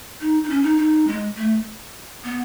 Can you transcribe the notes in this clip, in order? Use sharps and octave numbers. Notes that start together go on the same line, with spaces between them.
D#4
D#4
C#4
D#4
D#4
G#3
A3
B3